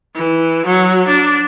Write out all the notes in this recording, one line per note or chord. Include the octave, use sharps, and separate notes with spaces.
E3
F#3
D4